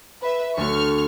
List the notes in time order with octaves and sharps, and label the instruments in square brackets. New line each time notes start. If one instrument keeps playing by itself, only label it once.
[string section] B4 E5
[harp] D2 A3 F#4 [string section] C#6 F6